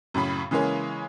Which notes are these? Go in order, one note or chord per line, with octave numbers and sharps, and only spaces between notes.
F#2 A2 C#3 B5
C#3 E3 G#3 A#3 C#4